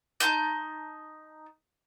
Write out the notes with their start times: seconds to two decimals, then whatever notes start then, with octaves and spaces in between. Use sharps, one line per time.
0.20 D#4 A5 C6 G6